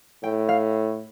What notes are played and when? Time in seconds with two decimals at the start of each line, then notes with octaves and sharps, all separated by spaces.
0.23 A2 G5
0.49 F5